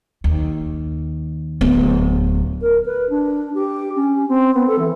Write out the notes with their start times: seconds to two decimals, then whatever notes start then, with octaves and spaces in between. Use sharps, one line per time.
0.24 D#2
1.61 D1 B3
2.62 A#4
2.86 B4
3.10 D4
3.54 G4
3.96 C#4
4.28 C4
4.55 B3
4.67 A4
4.79 E3